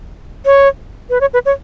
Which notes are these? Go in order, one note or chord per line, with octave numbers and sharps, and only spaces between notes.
C#5
B4
C#5
B4
C#5